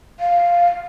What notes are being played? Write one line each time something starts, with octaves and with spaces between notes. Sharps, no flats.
F5